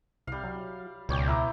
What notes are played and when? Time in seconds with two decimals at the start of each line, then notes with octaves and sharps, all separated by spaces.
0.27 C2 G3 F5
0.44 F#3
1.09 C#2 B2 C#5 D5 G5
1.27 E4 A#5 D6